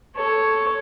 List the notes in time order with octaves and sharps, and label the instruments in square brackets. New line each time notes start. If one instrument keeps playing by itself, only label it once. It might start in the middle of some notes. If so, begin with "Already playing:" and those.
[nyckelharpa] A4 C#5